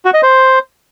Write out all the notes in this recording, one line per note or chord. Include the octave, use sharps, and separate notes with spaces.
F#4
D#5
C5